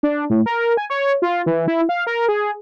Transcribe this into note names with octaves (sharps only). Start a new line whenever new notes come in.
D4
A2
A#4
G#5
C#5
F4
E3
E4
F5
A#4
G#4